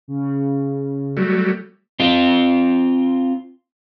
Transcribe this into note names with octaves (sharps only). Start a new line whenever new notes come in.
C#3
F#3 G3 A3
C4 F4